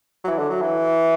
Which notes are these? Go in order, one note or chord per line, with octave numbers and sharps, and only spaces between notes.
F#3
E3
D3
F#3
E3